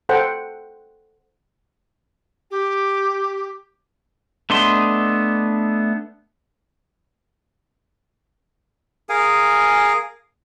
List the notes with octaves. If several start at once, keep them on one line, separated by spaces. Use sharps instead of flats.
A4 C5 F#5 G5
G4
A3 B3 D4 D#5 C6
G#4 A#4 F5 G#5